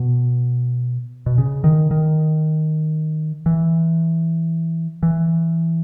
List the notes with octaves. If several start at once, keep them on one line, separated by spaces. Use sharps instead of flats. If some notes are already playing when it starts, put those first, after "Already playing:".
Already playing: B2
B2
C#3
D#3
D#3
E3
E3